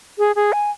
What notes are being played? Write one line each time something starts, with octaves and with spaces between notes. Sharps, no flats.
G#4
G#4
G#5